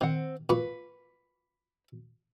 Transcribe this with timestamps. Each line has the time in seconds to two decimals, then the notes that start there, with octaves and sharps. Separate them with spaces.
0.01 D#3 C4 F#5
0.49 A#2 B4 C#6